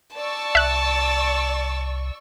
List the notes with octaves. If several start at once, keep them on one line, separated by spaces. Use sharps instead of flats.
D5 A5 C#6 E6
C2 E5 F#6